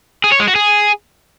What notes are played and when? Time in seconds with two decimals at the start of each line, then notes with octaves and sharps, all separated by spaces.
0.24 G#4
0.32 C#5
0.40 G#3
0.48 F#4
0.55 G#4